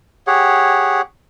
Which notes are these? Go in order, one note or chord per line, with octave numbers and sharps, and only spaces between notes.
G4 G#4 C#5 F#5